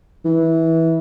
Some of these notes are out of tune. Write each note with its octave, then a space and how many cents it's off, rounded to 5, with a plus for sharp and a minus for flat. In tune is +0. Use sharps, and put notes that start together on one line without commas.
E3 -15